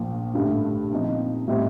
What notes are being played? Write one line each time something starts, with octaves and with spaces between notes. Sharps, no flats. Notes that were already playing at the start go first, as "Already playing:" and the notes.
Already playing: A#1 A#2 F3
A1 G2 D3 A3
A#2 F3 C4 D#4
A2 G3 C4 D#4